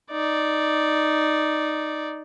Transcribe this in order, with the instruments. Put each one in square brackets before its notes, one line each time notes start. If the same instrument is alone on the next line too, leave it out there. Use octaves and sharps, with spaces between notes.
[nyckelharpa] D#4 D5